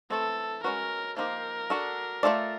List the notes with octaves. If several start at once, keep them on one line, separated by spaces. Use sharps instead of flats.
E3 A3 C4 A4
G#3 C#4 F#4 A#4 B4
F3 A#3 D#4 G4 A#4 C5
D4 F#4 A4
A3 C#4 F4 A4 D5